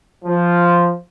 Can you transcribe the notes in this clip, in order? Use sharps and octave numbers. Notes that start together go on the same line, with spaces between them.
F3